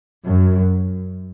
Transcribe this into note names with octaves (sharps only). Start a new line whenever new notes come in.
F#2